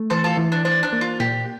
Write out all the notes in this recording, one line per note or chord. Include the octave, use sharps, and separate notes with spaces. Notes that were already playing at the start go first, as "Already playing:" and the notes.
Already playing: A3
E3 A4 C5
F4 A4
E3
D4
D4 C5
D4
A#3
F4
A#2 G4